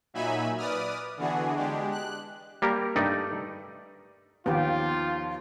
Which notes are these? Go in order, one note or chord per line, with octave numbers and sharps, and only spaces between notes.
A#2 F#3 D#4 E5 G#5 B5
B4 D5 D#6 F6
D3 E3 B3 D4 F#4 G#4
G#3 D4 G4
F#6
G3 A#3 G4 A#4
G2 A3 D#4 D5
D#2 F3 B3 F4 G4